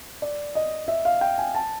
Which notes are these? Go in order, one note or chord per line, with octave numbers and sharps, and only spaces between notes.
D5
D#5
E5
F5
G5
G#5
A5